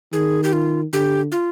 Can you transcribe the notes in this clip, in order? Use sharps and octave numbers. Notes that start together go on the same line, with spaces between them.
D#3 G#4
G4
F4
D3 G4
F4